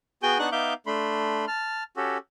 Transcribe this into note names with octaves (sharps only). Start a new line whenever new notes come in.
B3 F#4 G#4 G5 G#5 G6
B3 D4 D#4 F#5 C#6 F#6
B3 D#4 E5 F5 D6 G6
A3 D4 B5 C6
A5 F6
C#4 F#4 G4 A4